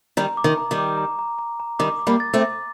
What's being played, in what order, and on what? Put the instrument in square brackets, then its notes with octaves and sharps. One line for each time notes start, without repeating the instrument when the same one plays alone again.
[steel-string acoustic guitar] D#3 G3 [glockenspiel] A#5
[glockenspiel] D6
[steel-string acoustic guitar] D#3
[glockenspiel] A#5
[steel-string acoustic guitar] D#3 G3
[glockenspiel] D6
A#5
A#5
A#5
A#5
[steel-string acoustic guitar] D#3 G3 [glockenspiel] D6
[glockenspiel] D6
[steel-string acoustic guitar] G3 A#3
[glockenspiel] A6
[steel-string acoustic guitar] A3 C4
[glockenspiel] D6